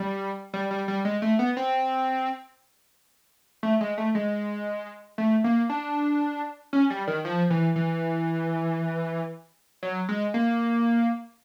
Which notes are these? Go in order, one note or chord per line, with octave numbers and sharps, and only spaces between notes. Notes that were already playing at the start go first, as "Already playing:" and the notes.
Already playing: G3
G3
G3
G3
G#3
A3
B3
C4
A3
G#3
A3
G#3
A3
A#3
D4
C#4
G3
D#3
F3
E3
E3
F#3
G#3
A#3